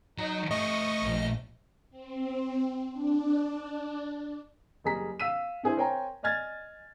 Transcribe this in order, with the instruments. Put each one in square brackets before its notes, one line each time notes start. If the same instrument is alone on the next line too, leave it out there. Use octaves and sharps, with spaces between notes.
[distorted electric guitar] F#3 A#5 [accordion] D#4
[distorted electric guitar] A3 G4 [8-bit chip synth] D#5 [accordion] C#6 D#6
[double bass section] A#1
[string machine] C4
D4
[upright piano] F#1 G3 G#4 A#5 B6
F5 E6 B6 D#7
D4 E4 G#4 C5
A#4 C5 C#5 G5 G#5 A#5
D5 D#5 G#5 F6 G#6 A6